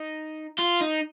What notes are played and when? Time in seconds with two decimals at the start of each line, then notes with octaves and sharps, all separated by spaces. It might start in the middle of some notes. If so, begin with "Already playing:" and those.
Already playing: D#4
0.59 F4
0.81 D#4